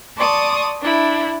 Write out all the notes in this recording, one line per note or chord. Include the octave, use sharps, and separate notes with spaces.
D5 A5 C6 C#6 D#6
D4 E4